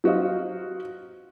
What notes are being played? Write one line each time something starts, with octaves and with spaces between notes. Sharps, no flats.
F#3 F#4 C5 D#5 F5